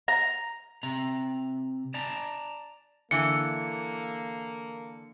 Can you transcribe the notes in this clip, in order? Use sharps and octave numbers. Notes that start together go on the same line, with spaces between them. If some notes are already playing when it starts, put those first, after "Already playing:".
A#5
C3 A#5
D5 A5 A#5
D3 E3 A#3 C#7